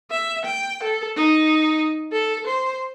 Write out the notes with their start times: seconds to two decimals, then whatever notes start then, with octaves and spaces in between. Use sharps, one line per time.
0.10 E5
0.45 G5
0.83 A4
1.16 D#4
2.12 A4
2.47 C5